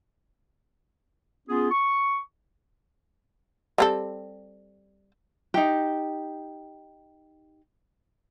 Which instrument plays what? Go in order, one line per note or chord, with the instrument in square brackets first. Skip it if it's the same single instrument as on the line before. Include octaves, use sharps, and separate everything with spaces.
[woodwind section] B3 C#4 F4 G#4
C#6
[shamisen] G3 C4 A4
[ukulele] D#4 G4